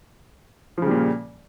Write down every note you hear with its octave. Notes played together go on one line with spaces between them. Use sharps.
A#2 C#3 F3 G3